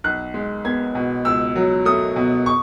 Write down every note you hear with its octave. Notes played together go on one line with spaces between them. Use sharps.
B1 F#6
G#3
B3 G#6
B2
C#2 E6
F#3
A3 D#6
B2
C#6